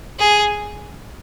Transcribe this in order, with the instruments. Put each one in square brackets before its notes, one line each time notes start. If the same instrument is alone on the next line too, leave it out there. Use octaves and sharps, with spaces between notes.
[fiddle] G#4